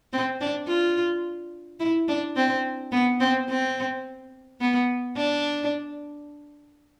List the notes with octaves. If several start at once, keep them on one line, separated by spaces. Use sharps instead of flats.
C4
D4
F4
E4
D4
C4
B3
C4
C4
B3
D4